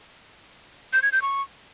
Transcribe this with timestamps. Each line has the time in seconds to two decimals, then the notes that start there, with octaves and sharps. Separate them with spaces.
0.93 G6
1.03 G#6
1.12 G6
1.22 C#6